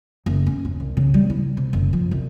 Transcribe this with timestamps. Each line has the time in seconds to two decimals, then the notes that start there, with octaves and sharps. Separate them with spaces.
0.26 F#1
0.46 C#4
0.65 D#2
0.80 C2
0.97 C#3
1.14 G3
1.30 E4
1.57 C3
1.73 F#1
1.93 F3
2.11 C2